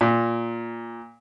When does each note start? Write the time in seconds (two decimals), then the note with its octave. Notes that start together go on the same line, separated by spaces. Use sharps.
0.01 A#2